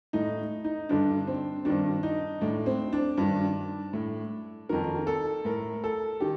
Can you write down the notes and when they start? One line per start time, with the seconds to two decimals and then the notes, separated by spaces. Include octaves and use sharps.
0.13 A2 D#4
0.64 D#4
0.89 G2 D3 D4
1.27 C4
1.65 G2 D#3 D4
2.03 D#4
2.41 A2 D4
2.66 C4
2.93 D4
3.18 G2 D#3
3.93 A2
4.69 F2 D#3 A#4
5.07 A4
5.45 A2 A#4
5.84 A4
6.20 D#3 G4